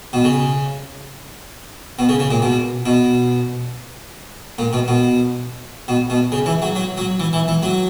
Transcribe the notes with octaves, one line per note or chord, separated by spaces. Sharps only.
B2
C#3
B2
C#3
C#3
A#2
B2
B2
A#2
B2
B2
B2
B2
C#3
E3
F#3
F#3
F#3
E3
E3
E3
F#3